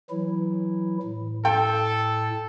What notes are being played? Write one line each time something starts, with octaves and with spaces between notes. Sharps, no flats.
E3 F#3 E4
A2
A4 G5